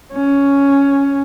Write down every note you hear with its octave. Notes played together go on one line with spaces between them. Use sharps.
C#4